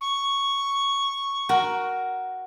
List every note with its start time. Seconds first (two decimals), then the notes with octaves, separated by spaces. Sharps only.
0.01 C#6
1.49 F#4 A#4